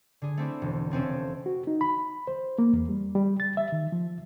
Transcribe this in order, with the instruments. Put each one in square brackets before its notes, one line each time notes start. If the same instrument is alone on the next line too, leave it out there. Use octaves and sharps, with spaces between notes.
[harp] D3 G#4
A3 C4 D4 E4
E1
F1 C4 C#4 A4
[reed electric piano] F#4
D#4
B5
C5
A#3
E2
G3
G3
A6
E5
D#3
F3